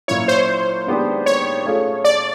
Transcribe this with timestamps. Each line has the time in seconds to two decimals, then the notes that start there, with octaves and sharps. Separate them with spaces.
0.08 A#2 F#3 A#3 C#4 E4 C#5
0.28 C5
0.87 D#3 G#3 B3 D4 G4
1.26 C#5
1.66 A3 C#4 F4 G#4
2.04 D5